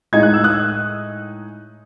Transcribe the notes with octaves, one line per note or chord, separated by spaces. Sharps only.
A2 G#3 D#4 G#6
F#6
E6
D#6 F#6